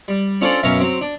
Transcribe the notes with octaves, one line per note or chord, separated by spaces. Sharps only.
G3
C#4 D4 F4 A4 C5 D5
F#2 B2 C#4 E5 F5 A#5
F#3 C4
D4